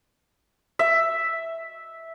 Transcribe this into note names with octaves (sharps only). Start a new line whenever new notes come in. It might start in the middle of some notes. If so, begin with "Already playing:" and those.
E5